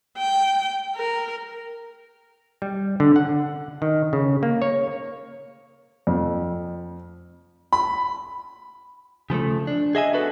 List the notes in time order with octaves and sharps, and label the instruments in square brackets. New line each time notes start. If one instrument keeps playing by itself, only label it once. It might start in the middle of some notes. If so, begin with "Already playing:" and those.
[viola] G5
A#4
[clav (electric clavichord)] G3
D3
F#5
D#3
C#3
A#3
C#5
[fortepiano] F2
[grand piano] B5
[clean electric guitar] C#3 F3 G#3 A3
D4
G#4 D#5 E5 G#5
B3 D4 F#4 A4 B4